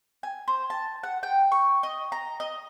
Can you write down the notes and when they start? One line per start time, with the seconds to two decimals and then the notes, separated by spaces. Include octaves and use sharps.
0.23 G#5
0.48 C5
0.70 A5
1.03 F#5
1.23 G5
1.52 C#6
1.83 D#5
2.12 A#5
2.40 D#5